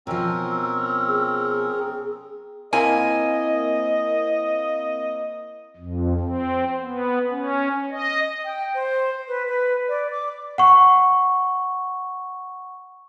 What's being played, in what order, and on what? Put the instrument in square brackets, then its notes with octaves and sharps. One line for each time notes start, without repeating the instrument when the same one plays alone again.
[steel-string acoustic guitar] B2 F3 [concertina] C4 C#4 A#4 [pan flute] E6
[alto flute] G#4
[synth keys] A#3 C4 E4 [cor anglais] D#5 [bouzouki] G#5
[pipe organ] F2
C4
B3
C#4
D#5
[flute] G5
C5
B4
B4
D5
D6
[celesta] F#5 C#6